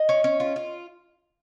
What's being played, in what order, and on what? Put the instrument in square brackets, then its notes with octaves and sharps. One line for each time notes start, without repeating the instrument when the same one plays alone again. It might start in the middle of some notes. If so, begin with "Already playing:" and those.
Already playing: [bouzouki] D#5
C#4
C#4
F4
F4